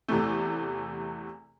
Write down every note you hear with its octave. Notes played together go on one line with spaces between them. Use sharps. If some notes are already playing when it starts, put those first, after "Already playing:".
E2 C3 E3 A3